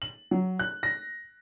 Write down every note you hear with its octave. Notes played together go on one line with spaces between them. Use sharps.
F#7
F#3
F#6
A#6